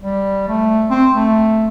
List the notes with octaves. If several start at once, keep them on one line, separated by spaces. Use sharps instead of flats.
G3
A3
C4
A3